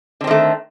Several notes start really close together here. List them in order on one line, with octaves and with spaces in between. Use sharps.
D3 C4 D#3 A3